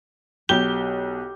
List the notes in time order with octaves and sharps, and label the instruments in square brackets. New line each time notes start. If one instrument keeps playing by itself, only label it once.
[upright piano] B1 G7 [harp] G4